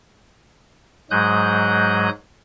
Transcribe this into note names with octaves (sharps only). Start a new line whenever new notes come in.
G#2 F#3 G#3 D#6 F#6 G6